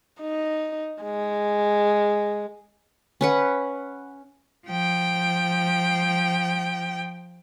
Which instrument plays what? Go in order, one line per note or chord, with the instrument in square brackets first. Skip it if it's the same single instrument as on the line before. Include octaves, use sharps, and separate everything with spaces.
[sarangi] D#4
G#3
[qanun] C#4 B4 F#5
[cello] F3 G5